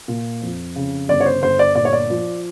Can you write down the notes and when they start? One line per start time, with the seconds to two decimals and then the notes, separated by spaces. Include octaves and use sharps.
0.08 A#2
0.42 F2
0.75 C#3
1.09 G1 D5
1.21 C#5
1.26 C5
1.42 G1 C5
1.59 D5
1.75 A#2 D5
1.85 C#5
1.93 D5
2.10 F3